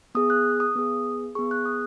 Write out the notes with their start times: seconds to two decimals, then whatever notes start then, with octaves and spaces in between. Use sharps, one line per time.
0.15 B3 G#4 D#6
0.30 F#6
0.60 D#6
0.76 B3 G#4
1.35 B3 G#4 C#6
1.51 F#6
1.66 D#6